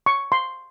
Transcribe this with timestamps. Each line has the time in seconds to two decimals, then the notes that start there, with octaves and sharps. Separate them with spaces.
0.06 C#6
0.32 C6